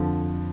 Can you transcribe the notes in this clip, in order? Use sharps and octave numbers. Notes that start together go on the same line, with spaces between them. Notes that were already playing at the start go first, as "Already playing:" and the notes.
Already playing: F2 D3 F3